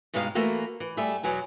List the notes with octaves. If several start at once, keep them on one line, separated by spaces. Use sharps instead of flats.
G2 B2 G#3 D#4 A#4 F5
E3 A3 A#3 F#4
E3
G3 A3 G#4 E5
E2 B2 F#3 G#5